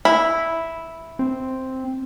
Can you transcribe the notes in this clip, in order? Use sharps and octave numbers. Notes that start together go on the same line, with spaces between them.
E4
C4